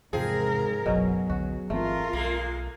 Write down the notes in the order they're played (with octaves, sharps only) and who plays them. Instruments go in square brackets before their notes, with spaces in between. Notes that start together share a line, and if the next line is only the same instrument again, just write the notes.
[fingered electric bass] E2 C3 [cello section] G#2 A#4 [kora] F3 C4 [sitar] G#4
[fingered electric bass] F#1 B1 F#2 [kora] B2 C#4 [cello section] F#3
[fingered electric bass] B1 E2 D3 [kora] F#4
[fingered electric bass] G1 E3 C4 [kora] A3 [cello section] F4 A#4
[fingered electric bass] B1 [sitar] G#3 A#3